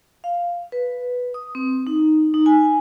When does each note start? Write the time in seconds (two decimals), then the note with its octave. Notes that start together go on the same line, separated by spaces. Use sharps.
0.24 F5
0.72 B4
1.34 D#6
1.55 C4
1.87 D#4
2.34 D#4
2.46 G#5